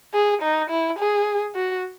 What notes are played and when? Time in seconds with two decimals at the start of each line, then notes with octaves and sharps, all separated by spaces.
0.14 G#4
0.42 D#4
0.70 E4
0.99 G#4
1.56 F#4